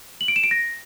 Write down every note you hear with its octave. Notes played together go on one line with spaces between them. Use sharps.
F#7
D7
E7
D7
A#6